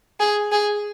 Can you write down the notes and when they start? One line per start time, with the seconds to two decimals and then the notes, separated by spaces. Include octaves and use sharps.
0.20 G#4
0.52 G#4